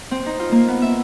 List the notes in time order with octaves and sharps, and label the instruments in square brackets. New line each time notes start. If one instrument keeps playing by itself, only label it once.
[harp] C4
D#4
F4
A#3
B3
E5